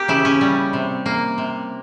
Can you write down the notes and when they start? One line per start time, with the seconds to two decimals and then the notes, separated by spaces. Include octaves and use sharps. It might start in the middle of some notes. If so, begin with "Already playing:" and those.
Already playing: A#3 G4
0.08 C#3 E4
0.25 C#4
0.41 G3
0.73 C3
1.06 A#3
1.38 C3